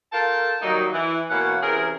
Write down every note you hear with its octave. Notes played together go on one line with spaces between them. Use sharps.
F4 A4 A#4 G5 A5
D#3 F#3 G3 A#3 D#4
E3
B2 E3 A#3 C#4 F#5
C3 E3 C#4 G#4 A#4